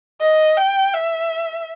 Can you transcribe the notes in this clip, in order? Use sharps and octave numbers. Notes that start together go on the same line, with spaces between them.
D#5
G5
E5